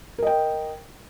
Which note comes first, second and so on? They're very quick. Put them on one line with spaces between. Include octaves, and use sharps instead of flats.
A#4 D#5 G5